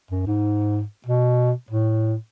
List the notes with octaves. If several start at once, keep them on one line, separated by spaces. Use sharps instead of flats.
F#2
G#2
B2
A2